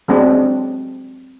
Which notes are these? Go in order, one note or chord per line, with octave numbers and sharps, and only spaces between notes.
F#3 G#3 C4 D4